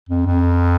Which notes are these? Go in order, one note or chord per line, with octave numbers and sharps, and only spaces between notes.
F2
F2